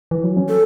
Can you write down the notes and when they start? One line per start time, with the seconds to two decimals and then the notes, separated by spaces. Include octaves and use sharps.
0.11 E3
0.24 F#3
0.37 C#4
0.48 A4